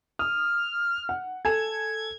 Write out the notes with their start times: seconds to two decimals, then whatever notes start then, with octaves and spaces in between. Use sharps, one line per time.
0.19 D#6 F6
1.09 F#5
1.45 A4 G#5 G#6 E7